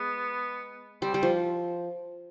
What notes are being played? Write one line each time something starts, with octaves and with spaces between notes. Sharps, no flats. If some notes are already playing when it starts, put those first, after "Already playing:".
Already playing: G#3 B3
G3 C4
G3
F3